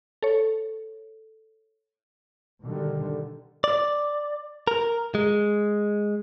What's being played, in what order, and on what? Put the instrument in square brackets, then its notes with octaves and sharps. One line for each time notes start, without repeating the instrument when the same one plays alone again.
[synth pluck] A4 C#5
[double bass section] B2 D3 D#3 G3
[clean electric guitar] D5
A#4
G#3